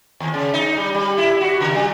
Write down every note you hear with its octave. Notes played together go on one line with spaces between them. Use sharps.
D#2
C#3
D#4
G3
G3
E4
F#4
C#3
G3